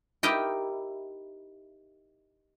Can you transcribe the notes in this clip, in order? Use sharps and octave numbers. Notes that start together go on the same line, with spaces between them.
D#4 E4 G4 A#4 D#5 G5